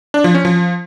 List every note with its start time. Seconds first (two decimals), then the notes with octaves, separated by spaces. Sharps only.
0.14 D4
0.24 F3
0.34 C#4
0.45 F3